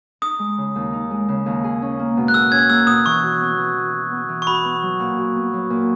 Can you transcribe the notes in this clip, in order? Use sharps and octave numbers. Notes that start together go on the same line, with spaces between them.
D#4 D#6
G#3
C#3
D#2
D#4
G#3
C#3
D#2
G#4
C#4
A#3
B2
F#6
G#4 E6
C#4 G#6
A#3 E6
B2 D#6
E3 C#6
F#4
B3
E3
E3
F#4
B3
E3
C#6
F#4 B5
B3
F#3
A#2
F#4
B3
F#3
A#2